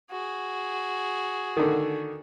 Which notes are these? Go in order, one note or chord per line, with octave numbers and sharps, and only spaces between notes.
F#4 G#4
D3 D#3